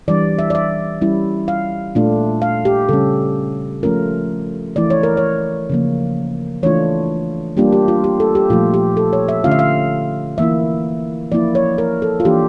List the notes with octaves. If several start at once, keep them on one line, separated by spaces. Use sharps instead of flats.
E3 G3 D4 D5
E5
D5
E5
G3 C#4 E4
F5
A#2 A3 D4 F4
F5
G4
C#3 G3 C#4 A4
F3 A3 C#4 F4 A#4
E3 A3 E4 D5
C#5
A#4
C#5
C#3 F3 A#3
E3 A3 D4 F4 C#5
G3 A#3 D4 F4 G4
G4
F4
G4
A4
G4
A#2 F3 A3 F4
G4
A4
C#5
E5
D3 A3 C#4 F4 F5
E5
F5
E3 A#3 E4 E5
F3 A#3 E4 D5
C#5
A#4
A4
F4
E3 A#3 D4 G4